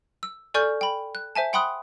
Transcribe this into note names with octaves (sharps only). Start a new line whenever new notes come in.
E6
A4 D5 G#5 C#6 F6 G6
G5 B5
F#6
C5 E5 G#5 A5
F#5 G5 B5 C6 D#6 F#6